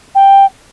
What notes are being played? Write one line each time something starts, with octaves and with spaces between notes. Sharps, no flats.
G5